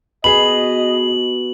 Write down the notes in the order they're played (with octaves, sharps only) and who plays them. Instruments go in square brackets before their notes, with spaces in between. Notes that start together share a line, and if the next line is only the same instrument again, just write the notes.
[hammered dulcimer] B2 [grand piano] G#4 B5 [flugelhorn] D#5 [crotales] F#7